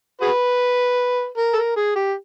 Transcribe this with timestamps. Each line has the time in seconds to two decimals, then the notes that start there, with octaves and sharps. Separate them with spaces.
0.21 F#4 G#4 B4
1.37 A#4
1.53 A4
1.57 A#4
1.76 G#4
1.95 G4